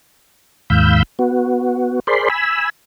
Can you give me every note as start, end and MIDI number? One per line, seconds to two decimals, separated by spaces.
0.70 1.03 39
0.70 1.03 44
0.70 1.03 77
0.70 1.03 83
0.70 1.03 88
0.70 1.03 91
1.19 2.00 59
1.19 2.00 66
2.07 2.28 68
2.07 2.28 70
2.07 2.28 72
2.07 2.28 74
2.07 2.28 83
2.07 2.28 84
2.30 2.70 80
2.30 2.70 83
2.30 2.70 88